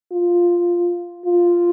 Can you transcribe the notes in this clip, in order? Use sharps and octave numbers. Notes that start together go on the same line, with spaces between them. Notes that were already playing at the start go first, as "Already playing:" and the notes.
F4
F4